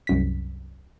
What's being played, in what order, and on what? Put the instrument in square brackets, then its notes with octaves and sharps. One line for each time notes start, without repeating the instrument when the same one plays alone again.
[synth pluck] C2 F#2 B6